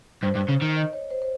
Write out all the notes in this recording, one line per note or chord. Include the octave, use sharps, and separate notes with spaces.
G2 C5
G2
C#3
D#3
D#5
C#5
C5
C5